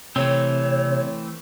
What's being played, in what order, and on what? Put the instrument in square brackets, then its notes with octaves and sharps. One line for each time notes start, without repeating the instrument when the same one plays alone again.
[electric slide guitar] C3 [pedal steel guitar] E3 A3 C4 [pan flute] C#5